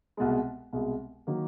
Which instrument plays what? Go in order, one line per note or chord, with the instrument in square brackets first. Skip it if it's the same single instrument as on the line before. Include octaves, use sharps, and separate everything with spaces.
[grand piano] C2 B2 G#3
C2 B2 G#3
D#3 F#3 A#3